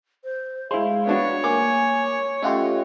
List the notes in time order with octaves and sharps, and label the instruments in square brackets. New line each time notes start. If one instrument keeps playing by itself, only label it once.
[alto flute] C5
[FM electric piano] G#3 [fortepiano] E4 C5 [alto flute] F5
[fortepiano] B3 D4 F#4 [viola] C#5
[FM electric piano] A#3 [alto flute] G#5 [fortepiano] D6
[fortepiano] A3 F#5 C6 [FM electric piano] C#4 F4 G4 [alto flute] D#5